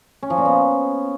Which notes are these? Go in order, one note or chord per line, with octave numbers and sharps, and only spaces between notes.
C#4
F3
A#2
B3